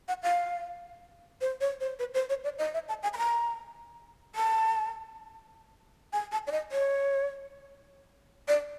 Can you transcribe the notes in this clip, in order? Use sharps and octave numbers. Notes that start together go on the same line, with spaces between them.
F#5
F5
C5
C#5
C5
B4
C5
C#5
D5
D#5
E5
A5
G#5
B5
A#5
A5
G#5
A5
D5
D#5
C#5
D5